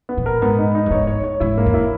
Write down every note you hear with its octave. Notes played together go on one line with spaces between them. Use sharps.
B3
A#2
A#4
G#2 B3
D#4
D#4
G2
G#2 C#5
C#5
C#5
G#2 E4
A#3
E2
E4